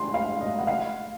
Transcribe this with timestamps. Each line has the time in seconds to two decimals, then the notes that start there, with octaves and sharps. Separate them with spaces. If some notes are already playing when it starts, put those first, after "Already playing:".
Already playing: C6
0.14 F5
0.41 D#5
0.59 F#5
0.67 F5